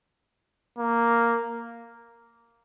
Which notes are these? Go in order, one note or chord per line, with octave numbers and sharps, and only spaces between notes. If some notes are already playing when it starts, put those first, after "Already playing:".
A#3